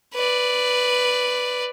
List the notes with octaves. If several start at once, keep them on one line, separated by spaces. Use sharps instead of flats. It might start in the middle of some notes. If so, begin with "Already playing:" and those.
B4 D5